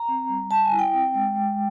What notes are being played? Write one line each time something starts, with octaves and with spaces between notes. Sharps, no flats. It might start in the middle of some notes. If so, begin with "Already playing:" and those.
Already playing: A#5
C4
G3
G3 A5
G#5
E4
G5
C4
G#3
G#3